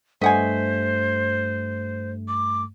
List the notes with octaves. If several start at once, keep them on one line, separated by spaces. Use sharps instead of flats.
G2 A3 C5 D#5 F#5 G#5 B6
D6